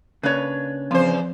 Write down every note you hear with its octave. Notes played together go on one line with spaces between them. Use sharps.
C#3 A#3 D4 B4 C#5
E2 F3 C4 C5